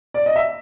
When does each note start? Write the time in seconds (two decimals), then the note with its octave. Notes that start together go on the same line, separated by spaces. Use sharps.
0.14 D5
0.26 D#5
0.36 E5